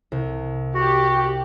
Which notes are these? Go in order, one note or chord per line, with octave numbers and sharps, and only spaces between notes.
C2
F#4 G4